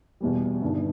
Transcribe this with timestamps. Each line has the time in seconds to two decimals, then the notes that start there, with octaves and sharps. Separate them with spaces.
0.20 E2 B2 G3
0.61 G1 G2 D#3